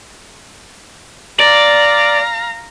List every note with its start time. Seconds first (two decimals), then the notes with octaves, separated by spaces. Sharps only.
1.40 D5 F5 A#5